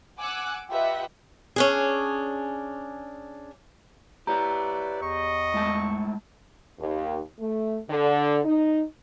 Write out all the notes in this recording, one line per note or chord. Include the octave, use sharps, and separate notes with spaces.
F#5 G#5 D6 E6 F#6
F4 G4 B4 D#5 E5 F#5
C#4 D4 G#4
E4 G4 B4 C#5 D5 A#5
E2 D#5 C#6
A2 G#3 A5
D#2
A3
D3
D#4